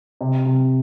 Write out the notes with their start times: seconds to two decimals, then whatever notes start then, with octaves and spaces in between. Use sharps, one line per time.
0.21 C3
0.46 C3